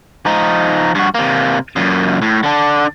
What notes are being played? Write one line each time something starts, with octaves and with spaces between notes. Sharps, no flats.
F3 D#4
G2 F#4
C3 A#3
F#2 A#2
A2
D3 D4